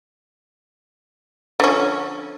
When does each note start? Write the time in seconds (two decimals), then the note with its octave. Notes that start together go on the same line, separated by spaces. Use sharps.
1.60 D3 F3 C#4